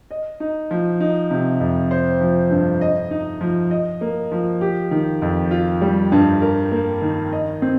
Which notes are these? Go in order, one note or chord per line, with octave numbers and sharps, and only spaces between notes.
D#5
D#4
F3
D#4
C3
F2
C5
F3
G2
D#5
D#4
F3
D#5
A#3
F3
G4
D#3
F2
F4
G3
G2
A#4
A#3
D#3
D#5
C4